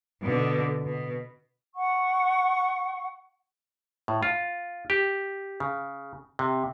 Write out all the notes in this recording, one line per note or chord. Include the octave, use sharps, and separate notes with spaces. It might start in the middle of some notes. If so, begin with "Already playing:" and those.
B2 D3
B2
F#5 C#6
A2
F4
G4
C#3
C3